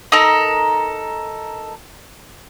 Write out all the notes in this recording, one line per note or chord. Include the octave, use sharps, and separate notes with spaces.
D#4 A4 A#4